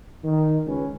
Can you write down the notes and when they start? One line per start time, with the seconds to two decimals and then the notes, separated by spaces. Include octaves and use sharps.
0.24 D#3
0.66 C#2 C#4 B4